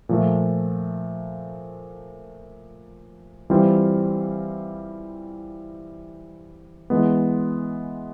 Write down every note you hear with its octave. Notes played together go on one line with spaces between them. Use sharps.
A#2 F3 A3
E3 G3 C4 F4
E3 G#3 B3